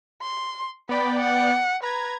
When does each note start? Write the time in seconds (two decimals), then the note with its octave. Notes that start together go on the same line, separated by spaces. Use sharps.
0.22 C6
0.89 B3 D5 G5 B5
1.19 F#5
1.83 B4 A#5 G#6